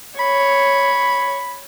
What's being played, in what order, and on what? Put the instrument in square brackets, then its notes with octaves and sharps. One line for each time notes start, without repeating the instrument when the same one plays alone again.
[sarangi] C#5 [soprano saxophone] B5